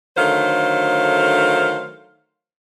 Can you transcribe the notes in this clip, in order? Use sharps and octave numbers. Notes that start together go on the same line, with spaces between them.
D3 D#3 F#3 A3 C5 F5